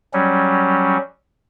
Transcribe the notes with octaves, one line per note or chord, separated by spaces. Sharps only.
F#3 G3 C#4